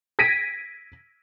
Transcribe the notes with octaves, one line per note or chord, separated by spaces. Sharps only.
G#6 A#6 B6 D7 D#7